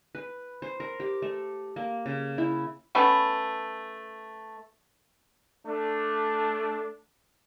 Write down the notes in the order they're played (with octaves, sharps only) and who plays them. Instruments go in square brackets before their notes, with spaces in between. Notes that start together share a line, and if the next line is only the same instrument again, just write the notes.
[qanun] B4
C5
A#4
G4
A3
A#3
C#3
E4
[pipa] A3 B3 C#4
[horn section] A3 D4